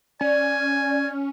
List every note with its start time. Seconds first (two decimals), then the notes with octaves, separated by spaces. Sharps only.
0.21 C#4 D5 G#5